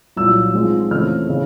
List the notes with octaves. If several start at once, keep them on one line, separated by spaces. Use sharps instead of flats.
C2 A#2 F#3 E6
G#2 F3 G#3 C4 F4
E2 C#3 F3 A3 C4 F6
C#3 E3